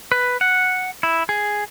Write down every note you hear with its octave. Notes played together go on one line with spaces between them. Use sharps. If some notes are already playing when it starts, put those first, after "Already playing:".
B4
F#5
E4
G#4